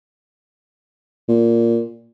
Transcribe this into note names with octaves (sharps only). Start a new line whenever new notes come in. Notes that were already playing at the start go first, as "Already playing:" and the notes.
A#2